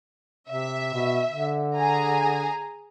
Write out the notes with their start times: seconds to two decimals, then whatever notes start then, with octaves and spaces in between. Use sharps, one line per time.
0.49 C3 E5
0.93 B2
1.30 D3
1.75 G#4 G#5 A#5